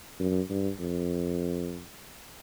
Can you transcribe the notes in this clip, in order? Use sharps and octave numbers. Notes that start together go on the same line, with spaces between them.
F#2
G2
F2